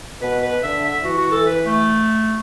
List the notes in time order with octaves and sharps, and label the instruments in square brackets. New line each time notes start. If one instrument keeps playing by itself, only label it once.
[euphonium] B2 [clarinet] B4
[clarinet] B4
[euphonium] D3 [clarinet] E5
[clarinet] E5
[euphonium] E3 [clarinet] F#4
[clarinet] F#4
A4
B4
A3